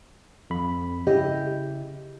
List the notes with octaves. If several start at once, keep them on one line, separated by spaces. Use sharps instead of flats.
F2 B5
C#3 E4 G4 D#5